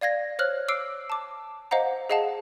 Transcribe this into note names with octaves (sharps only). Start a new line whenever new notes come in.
D5 F5 G#6 A#6
C5 C#5 F6 F#6 F#7
D6 E6 C7 D7
A5 D6
C5 D#5 F5 F#5 A#5
G#4 D#5 F5 F#5 A5